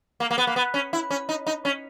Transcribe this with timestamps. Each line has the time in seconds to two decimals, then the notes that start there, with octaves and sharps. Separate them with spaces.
0.20 A#3
0.31 A#3
0.38 B3
0.47 A#3
0.56 B3
0.74 C#4
0.93 E4
1.11 C#4
1.29 D#4
1.47 D#4
1.65 C#4